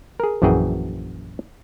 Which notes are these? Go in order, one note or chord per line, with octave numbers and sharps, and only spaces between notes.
G#4 A#4
A#1 F#2 E3 F#4 G#4 G5